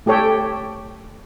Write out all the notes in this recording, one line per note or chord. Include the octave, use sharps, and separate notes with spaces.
A3 G4 A4 C#5 G5